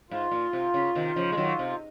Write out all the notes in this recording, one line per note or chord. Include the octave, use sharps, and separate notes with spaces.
G#2 F4
A#2
C3
C#3
C3 D#3
C#3 F3
G#3
D#3 F#3
C3